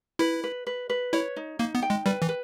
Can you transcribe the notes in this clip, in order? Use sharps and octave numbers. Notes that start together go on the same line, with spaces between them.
E4 B4
B4
B4
B4
E4 C#5
D#4
A#3 D#4
B3
G5
G#3
G3 B4
E3
B4